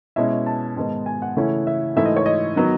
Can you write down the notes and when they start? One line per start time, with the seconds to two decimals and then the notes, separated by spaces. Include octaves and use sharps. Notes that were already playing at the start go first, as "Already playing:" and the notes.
0.16 B2 G#3 C#4 E4 E5
0.46 A5
0.77 G#2 D#3 G#3 B3 D#4
1.06 G#5
1.22 F#5
1.37 C#3 E3 A3 C#4 E4
1.67 E5
1.96 G#2 E3 A3 E4 E5
2.06 D#5
2.16 C#5
2.26 D#5
2.56 D#3 F#3 B3